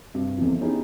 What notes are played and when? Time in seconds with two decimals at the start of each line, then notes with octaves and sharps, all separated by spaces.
0.14 G2 C3
0.37 F1 E2 C3 E3 F3
0.61 B3 C#4 D#4 E4 G4 G#4